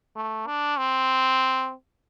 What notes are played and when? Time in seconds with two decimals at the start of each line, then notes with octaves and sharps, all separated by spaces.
0.16 A3
0.47 D4
0.77 C4